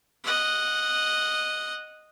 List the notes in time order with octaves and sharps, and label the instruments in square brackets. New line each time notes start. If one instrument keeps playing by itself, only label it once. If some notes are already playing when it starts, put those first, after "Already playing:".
[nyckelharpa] D#5 F#5